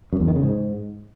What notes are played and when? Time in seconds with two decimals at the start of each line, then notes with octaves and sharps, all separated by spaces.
0.13 F#2
0.20 E2
0.28 D#3
0.35 C#3
0.43 G#2